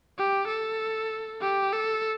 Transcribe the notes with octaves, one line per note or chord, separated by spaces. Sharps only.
G4
A4
G4
A4